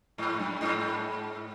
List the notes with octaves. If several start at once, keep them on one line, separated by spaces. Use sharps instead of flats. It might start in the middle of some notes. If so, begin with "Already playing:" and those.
G#2
F#2
G#2